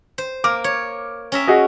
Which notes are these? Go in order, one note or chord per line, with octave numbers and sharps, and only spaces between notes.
C5
A#3 D6 F6
C#5
C#4 A#4 E5
F#4 G#4 D#5